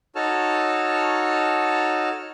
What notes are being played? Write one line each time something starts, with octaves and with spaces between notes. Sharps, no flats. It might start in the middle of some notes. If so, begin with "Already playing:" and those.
D#4 F#4 A4 C#5 A5 F6